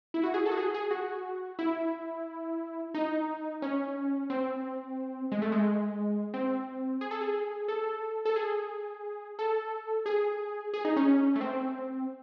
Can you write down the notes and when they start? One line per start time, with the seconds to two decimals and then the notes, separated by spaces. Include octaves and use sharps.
0.14 E4
0.23 F#4
0.34 G#4
0.46 A4
0.51 F#4
0.57 G#4
0.74 G#4
0.91 F#4
1.59 E4
2.94 D#4
3.62 C#4
4.30 C4
5.32 G#3
5.42 A3
5.52 G#3
6.34 C4
7.01 G#4
7.11 A4
7.21 G#4
7.68 A4
8.25 A4
8.36 G#4
9.39 A4
10.06 G#4
10.74 G#4
10.85 D#4
10.96 C#4
11.36 A3
11.41 C4